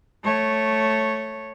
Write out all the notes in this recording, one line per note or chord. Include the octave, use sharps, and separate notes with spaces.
A3 C#5